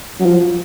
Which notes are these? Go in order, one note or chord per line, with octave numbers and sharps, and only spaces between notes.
F#3
F3